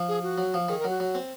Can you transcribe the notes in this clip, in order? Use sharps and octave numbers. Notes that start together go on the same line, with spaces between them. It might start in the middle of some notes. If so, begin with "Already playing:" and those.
Already playing: F3
G#4
F#4
F#3
F3
D#3 G#4
A#4
F#3
F#4
F#3
C4